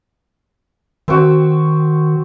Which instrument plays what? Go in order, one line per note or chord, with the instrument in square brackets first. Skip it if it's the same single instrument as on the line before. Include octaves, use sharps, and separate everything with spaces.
[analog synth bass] D#3 [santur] C4 F#4